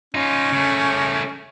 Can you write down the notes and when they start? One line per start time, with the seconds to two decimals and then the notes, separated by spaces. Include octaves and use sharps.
0.14 C#4 D#4 F4
0.53 C#3 A3